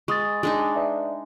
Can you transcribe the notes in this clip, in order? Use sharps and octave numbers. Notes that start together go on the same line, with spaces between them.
G#3 C#6 D#6 A6
G#3 D4 D#4
B4 D5 E5